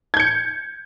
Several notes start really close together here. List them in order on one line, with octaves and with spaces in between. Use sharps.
G#6 G6 C#7